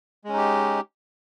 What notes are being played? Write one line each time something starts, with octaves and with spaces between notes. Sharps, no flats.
G#3 C#4 D#4 G4